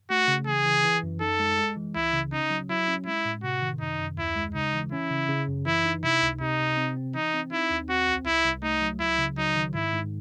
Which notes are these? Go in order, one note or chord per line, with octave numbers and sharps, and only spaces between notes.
A3 F#4
C#3
E3 G#4
E3
E3
F#2
D#4 A4
G#3
G#3
E3
C#2 E4
C#3
C#4 D#4
F#3
F#3 E4
C#4
G#3 E4
A2
C3 F#4
D#3
F#2 D#4
F#2
D#2 E4
G#3
C#3 D#4
E3
C#4 E4
C#3
C#3
F#2
E3 E4
D#4
C3 E4
C#2
C3 D#4
C3
C4
C4
E3 D#4
C4
D#4 E4
D#2
C4 F#4
C2
C2 E4
C2
A3 D#4
F#3
C#2 E4
C#3
F#3 D#4
D#3
G#2 E4
G#2